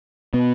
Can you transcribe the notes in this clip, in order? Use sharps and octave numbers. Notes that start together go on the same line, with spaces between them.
B2 B3